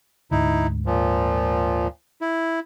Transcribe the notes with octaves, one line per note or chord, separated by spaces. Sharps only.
D2 G#2 D3 D#4 E4
A#2 F3
E4